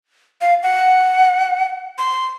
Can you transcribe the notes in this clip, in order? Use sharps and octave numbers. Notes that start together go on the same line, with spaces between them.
F5
F#5
C6